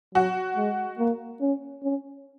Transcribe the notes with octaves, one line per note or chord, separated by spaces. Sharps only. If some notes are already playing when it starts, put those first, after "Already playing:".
F#3 F#4
G#3
A#3
C#4
C#4